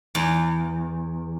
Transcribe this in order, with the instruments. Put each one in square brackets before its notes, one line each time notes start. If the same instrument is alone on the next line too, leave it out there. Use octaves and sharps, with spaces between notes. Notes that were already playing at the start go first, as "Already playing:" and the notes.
[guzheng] E2